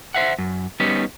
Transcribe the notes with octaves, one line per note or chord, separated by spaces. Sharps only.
C5 E5 F#5
F#2
G3 B3 C#4 D#4